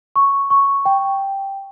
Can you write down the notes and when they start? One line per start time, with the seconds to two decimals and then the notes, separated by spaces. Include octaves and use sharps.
0.16 C#6
0.50 C#6
0.85 G5